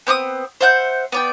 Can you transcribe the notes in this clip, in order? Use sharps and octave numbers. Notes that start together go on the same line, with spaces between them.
B3 C4 C#6 D#6
C5 E5 F#5 G6
B3 D5 G5